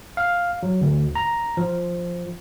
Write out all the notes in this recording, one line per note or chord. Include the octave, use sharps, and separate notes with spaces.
F5
F#3
D2
A#5
F3